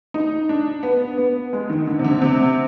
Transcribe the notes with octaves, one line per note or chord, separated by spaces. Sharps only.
D#4
D4
B3
B3
G#3
D#3
D3
C3
D3
C3